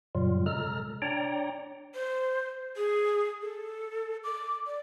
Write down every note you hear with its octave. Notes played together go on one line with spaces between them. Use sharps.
F#2 A#2 C#3 F#3 G3 F4
C3 G#3 A4 A#5 F6
D4 C#5 D5 G5 A#5
C5
G#4
A4
D6
D5